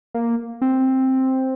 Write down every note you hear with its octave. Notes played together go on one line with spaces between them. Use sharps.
A#3
C4